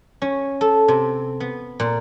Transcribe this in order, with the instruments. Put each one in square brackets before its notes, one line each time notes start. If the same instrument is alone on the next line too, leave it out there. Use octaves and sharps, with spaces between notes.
[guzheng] C#4
A4
C3
B3
A#2